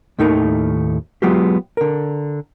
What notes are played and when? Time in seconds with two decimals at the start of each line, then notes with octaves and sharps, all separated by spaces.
0.19 D#2 A2 D#3 A3 D#4 A#4
1.22 F#3 G#3 B3 F4 G4
1.77 D3 A#4